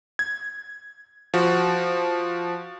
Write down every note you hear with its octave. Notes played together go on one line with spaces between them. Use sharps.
G#6
F3 F#4